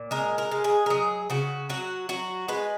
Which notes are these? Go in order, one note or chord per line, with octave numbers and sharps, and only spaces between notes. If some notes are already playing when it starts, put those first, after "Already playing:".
Already playing: A#2
G#3 A#4
A#4
G#3
G#4
A#4
F#3 G#4
C#3 F#4
F#3 F#4
F#3 F#4
G#3 B4